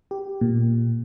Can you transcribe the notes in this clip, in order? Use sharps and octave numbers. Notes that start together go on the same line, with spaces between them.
G4
A#2